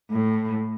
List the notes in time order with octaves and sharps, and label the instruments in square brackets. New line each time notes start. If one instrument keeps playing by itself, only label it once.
[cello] A2